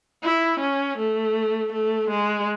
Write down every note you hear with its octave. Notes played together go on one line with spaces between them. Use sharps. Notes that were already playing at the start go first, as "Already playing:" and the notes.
E4
C#4
A3
A3
G#3